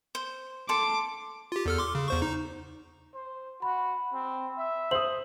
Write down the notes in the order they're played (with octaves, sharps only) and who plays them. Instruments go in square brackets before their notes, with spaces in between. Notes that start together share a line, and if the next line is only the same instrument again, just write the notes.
[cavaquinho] C5
[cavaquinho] A4 C6 [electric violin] D6
[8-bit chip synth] F4 G4
E2 A4 F6
C6 D6
C#3
E2 C5 C#6
D#4
[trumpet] C5
[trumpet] F#4 [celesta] B5
[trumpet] C4
E5
[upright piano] C5 D#6 [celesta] F#7